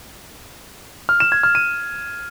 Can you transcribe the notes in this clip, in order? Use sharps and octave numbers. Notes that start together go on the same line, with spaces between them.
F6
E7
G#6
F6
D#7